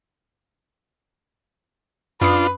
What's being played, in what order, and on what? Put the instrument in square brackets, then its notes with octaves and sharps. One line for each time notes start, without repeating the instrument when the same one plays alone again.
[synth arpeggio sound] F#2 D#6 C7 [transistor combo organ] D4 F4 [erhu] B4